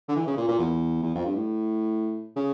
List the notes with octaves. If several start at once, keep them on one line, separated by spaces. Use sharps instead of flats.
D3
E3
C#3
A#2
A#2
E2
E2
F2
G2
A2
C#3